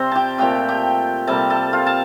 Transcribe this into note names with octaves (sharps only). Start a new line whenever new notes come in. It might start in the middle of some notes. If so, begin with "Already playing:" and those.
Already playing: C3 G3 C4 C5
G4 G5 A5
A#2 A3 C4 G4 G5
G4 G5
C3 G3 A#3 A4 A5
A4 A5
F4 F5
A5